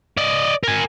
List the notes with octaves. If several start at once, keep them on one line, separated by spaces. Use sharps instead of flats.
D5 D#5
A#4 G#5